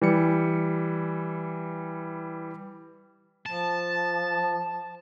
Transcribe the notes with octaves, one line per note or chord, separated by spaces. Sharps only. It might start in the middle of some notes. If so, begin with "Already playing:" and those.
E3 G3 C#7
F3 A5